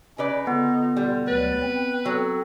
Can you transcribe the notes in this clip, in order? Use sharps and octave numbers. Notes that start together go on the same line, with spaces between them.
C#3 C#4 D#4 B4 D5
D3 B3 F4
B2 G3
D2 F#3 B4 D5
C4
F#3 C4 A4